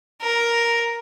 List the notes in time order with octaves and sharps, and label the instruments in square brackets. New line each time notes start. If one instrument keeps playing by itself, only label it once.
[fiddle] A#4